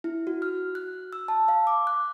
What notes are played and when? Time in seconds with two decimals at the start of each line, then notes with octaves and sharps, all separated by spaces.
0.04 E4
0.27 F#4
0.42 F6
0.75 F#6
1.13 E6
1.28 A5
1.48 F5
1.67 D6
1.87 F#6